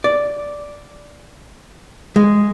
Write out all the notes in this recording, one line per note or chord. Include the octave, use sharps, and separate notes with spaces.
D5
G#3